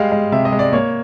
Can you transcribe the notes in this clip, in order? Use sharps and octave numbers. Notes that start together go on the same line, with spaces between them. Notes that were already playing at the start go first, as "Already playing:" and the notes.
Already playing: G3 G#3 F5
G#3
C3 E5
D#5
G#3
D5
A#3 C#5